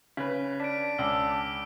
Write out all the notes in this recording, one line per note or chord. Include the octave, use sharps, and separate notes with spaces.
C#3 B4 B6
D4 B6 D7
C#2 A5 D6 E6